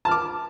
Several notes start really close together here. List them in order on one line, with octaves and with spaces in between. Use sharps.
A5 F6 D6